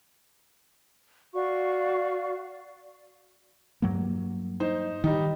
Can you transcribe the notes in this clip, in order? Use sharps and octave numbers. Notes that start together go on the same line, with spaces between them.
F#4 D5 F5 C#6
G2 F#3 A#3
D#4 C5
D#3 G3 D#4